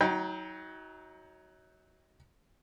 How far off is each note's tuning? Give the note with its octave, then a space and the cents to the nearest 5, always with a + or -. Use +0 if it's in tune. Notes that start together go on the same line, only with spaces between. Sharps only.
F#3 +10 D#4 +40 G5 +15